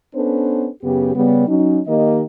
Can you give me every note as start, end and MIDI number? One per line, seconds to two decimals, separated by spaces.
0.15 0.69 59
0.15 0.69 61
0.15 0.69 62
0.15 0.69 69
0.15 0.69 71
0.15 0.69 72
0.83 1.12 42
0.83 1.12 49
0.83 1.12 59
0.83 1.12 67
1.15 1.48 49
1.15 1.48 55
1.15 1.48 59
1.48 1.80 54
1.48 1.80 61
1.48 1.80 63
1.87 2.22 51
1.87 2.22 58
1.87 2.22 67
1.87 2.22 70
1.87 2.22 75